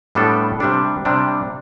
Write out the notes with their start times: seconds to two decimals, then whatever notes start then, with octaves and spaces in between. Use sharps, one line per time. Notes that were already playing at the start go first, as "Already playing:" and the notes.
0.15 A2 G3 B3 D4 A4
0.60 C3 G3 D4
1.05 C3 G3 D4